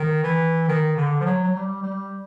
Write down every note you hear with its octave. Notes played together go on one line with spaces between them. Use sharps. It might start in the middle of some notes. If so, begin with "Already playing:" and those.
Already playing: D#3
E3
D#3
D3
F3
F#3
F#3
G3
G3